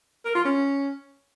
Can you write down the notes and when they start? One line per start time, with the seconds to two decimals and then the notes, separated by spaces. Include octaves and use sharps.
0.25 A#4
0.35 F4
0.45 C#4